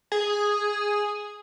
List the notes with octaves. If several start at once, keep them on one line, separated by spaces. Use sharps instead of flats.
G#4